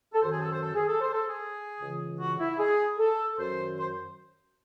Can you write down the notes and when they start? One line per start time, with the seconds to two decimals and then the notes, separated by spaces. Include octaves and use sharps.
0.13 A4
0.21 F#2 C5
0.26 D#3
0.31 G#4
0.41 A4
0.51 C5
0.61 A4
0.74 G#4
0.87 A4
1.00 C5
1.13 A4
1.27 G#4
1.79 C#2 C#3 E3
2.19 F#4
2.39 E4
2.58 G#4
2.98 A4
3.37 F#2 D#3 C5
3.77 C5